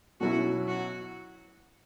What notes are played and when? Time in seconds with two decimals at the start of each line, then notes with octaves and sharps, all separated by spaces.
0.20 B2 F#3 C#4 E4 F#4
0.67 F#4